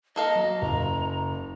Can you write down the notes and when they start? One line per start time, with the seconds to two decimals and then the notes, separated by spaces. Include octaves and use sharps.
0.16 A#3 A4 D#5 F5
0.35 F#3
0.62 F#1 A#5